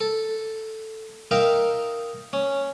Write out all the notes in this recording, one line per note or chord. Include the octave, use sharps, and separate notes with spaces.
A4
D#4 A#4 E5 F5 G5
C#4